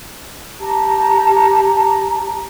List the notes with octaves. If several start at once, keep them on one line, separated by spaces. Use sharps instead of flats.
G4 A5 A#5